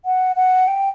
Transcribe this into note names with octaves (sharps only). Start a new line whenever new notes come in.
F#5
F#5
G5